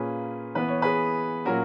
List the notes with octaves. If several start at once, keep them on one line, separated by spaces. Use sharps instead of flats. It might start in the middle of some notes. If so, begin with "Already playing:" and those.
Already playing: A#2 A#3 C#4 G#4 B4
E3 B3 B4
C#5
G#4 B4
A#2 F#3 C#4 F#4 A#4